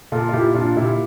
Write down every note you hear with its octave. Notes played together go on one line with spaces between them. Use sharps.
A#2 F4 A4
F4
A#2 E4 G4
A#2 D4 F4
A#2 E4 G4